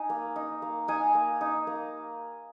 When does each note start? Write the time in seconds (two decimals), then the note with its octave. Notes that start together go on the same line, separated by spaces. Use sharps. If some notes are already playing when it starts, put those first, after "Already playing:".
Already playing: D#4 G#5
0.10 A#3
0.36 D#4
0.62 A#3
0.88 D#4 G#5 A#5
1.15 A#3
1.41 D#4
1.67 A#3